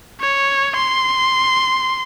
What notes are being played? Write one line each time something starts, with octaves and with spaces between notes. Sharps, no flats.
C#5
C6